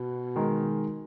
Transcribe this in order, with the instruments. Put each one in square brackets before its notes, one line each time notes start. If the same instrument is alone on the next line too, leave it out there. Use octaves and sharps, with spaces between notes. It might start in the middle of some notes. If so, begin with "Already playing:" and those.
Already playing: [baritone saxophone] B2
[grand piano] D#3 G#3 D#4 A#4